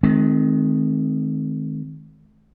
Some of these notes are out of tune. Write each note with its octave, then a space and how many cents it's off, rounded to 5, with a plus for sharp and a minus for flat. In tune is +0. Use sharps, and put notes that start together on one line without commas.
D#3 +0 G#3 +45 C4 +0